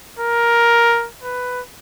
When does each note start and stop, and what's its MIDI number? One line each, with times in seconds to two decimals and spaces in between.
0.19 1.08 70
1.23 1.61 71